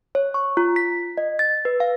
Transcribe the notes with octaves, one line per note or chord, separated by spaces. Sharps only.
C#5
C#6
F4
B6
D#5
A6
B4
F5